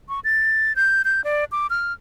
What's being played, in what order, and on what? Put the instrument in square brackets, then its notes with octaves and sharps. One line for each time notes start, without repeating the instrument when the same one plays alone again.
[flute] C#6
A6
G6
G6
D5
D6
F6